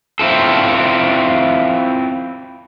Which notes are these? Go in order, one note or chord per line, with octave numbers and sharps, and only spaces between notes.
C4 E4 F4 A4